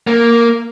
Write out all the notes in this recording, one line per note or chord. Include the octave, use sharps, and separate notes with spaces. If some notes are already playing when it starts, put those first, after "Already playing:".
A#3